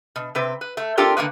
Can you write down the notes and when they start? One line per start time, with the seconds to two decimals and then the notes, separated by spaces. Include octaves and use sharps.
0.16 B2
0.35 C3 C4 B4
0.61 B4
0.77 A3
0.97 C4 D4 F4 G4 A4 A#4
1.17 D3 D#3 A#3 B4